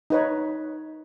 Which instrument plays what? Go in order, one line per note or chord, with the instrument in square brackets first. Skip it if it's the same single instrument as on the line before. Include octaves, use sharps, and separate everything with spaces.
[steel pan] D#4 B4 C#5